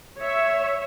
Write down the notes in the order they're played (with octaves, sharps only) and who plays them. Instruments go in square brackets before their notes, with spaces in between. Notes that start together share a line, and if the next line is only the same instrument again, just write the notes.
[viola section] C#5 E5